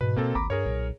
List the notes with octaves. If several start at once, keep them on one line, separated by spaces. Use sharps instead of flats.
G#2 B2 E3 B4
A#3 C4 C#4 A4
G#1 D2 A#5 B5 D6
G2 G#4 A#4 C#5
B1 A#2